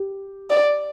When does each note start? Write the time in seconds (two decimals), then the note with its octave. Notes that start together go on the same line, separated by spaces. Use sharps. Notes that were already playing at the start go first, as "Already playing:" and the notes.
Already playing: G4
0.50 D5